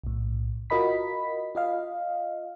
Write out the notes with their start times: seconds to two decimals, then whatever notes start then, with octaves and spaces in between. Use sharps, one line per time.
0.04 B1 A2
0.70 F4 F#4 A#4 D#5 B5 B6
1.55 F4 D#5 F5